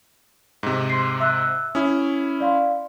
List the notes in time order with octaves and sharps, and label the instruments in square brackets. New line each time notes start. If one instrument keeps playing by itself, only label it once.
[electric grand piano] G#2 C3
[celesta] C6 C7
E5 E6 F#6
[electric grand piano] C#4 E4 [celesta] D#6
[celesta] D5 F5 C6